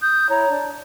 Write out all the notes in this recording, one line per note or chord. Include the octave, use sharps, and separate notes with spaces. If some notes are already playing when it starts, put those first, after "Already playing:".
D#6 G6
E4 C#5 A#5
D4